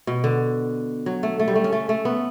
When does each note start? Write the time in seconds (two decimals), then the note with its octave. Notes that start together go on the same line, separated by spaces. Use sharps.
0.07 B2
0.24 D3
1.06 F#3
1.23 A3
1.40 A3
1.48 G3
1.56 A3
1.64 C#4
1.72 A3
1.89 A3
2.05 B3